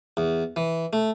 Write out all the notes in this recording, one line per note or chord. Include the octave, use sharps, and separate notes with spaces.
E2
E3
A3